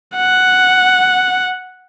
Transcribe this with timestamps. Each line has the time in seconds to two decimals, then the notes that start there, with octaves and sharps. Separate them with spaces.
0.16 F#5